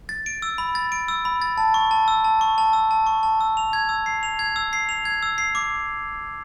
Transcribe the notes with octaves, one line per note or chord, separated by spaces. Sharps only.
A6
D7
E6
B5
A6
D7
E6
B5
A6
A5
C#6
A5
E6
A5
C#6
A5
E6
A5
C#6
A5
E6
F7
G#6
E6
C7
F7
G#6
E6
C7
F7
G#6
E6
C7
D6